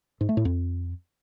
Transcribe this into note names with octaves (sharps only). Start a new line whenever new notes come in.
G#2
A3
A2
F2